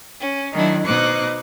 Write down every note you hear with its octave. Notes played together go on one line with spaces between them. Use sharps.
C#4
D#3 F#3 A3 D4 E4
B2 D#4 C5 D6 F#6